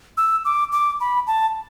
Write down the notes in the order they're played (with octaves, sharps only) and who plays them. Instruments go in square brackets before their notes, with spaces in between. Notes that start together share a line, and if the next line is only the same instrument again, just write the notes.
[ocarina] E6
D6
D6
B5
A5